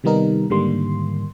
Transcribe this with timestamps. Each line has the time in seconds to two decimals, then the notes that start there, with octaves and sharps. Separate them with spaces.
0.04 C3 D#3 G3 B3 D#4 A#4
0.50 G#2 D3 D#3 G3 A#3 C6